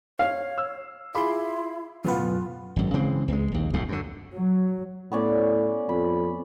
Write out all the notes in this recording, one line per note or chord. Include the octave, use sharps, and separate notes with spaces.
C#5 F5
E6
E4 F4 G#4 B5 C6 D6
D1 F#2 B2 B3 F4 B4 F#5
G#1 F#2
C#3 E3 G#3 C4
C#2 G#3
A#1 D#2
D1 B1 F#2 A2
F#2 D3
F#3
A2 B3 C#4 D5
F2 B5